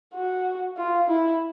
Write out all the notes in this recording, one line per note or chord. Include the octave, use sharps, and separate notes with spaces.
F#4
F4
E4